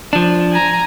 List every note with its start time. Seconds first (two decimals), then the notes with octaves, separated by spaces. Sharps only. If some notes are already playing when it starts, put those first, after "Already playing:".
0.13 F3 D4
0.52 G#5 A#5